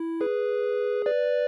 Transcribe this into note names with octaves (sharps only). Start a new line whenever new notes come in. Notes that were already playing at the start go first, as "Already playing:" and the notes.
Already playing: E4
G#4 B4
B4 D5